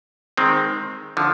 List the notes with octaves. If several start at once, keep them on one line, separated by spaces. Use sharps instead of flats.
D#3 G#3 C4
D3 F3